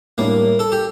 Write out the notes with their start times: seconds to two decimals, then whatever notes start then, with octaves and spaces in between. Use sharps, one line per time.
0.18 A2 G3 A#3 D4
0.59 A4
0.72 G4